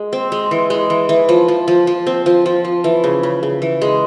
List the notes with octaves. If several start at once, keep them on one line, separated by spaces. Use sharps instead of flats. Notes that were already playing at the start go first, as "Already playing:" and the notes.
Already playing: G#3
C4
G#3
E3
G#3
E3
E3
F3
F3
F3
F3
C4
F3
F3
F3
E3
C#3
C#3
C#3
E3
G#3